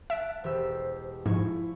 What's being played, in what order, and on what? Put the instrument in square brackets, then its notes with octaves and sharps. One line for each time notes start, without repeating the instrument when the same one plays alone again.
[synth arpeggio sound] E5 [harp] F#5 A5 D7
[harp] E1 G4 E6 [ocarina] C5
[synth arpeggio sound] G#2 [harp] F3 G#5 C#6 [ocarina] E4